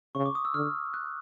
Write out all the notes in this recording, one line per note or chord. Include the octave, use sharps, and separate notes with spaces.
C#3 C#6
D6
D#6
E6
D3 F6
F#6